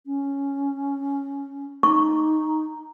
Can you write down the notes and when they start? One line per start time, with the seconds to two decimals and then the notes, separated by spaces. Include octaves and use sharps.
0.06 C#4
1.83 D#4 C#6